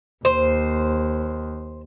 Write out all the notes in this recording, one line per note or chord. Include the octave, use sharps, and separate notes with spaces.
D#2 C5